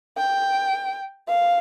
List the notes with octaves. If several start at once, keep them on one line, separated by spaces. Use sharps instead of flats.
G5
F5